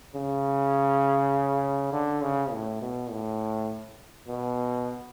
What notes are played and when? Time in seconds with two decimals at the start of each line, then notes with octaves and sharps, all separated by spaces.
0.15 C#3
1.92 D3
2.22 C#3
2.52 A2
2.81 B2
3.10 A2
4.28 B2